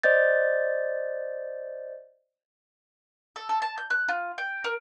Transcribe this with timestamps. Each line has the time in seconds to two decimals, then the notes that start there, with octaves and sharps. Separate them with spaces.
0.03 C5 D5 D#5 G6 A6
3.36 A4
3.49 A4
3.62 A5
3.78 G6
3.90 F#6
4.08 F4
4.38 G5
4.64 A#4